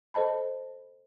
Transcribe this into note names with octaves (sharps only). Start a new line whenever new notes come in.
A4 C5 D#5 A5 B5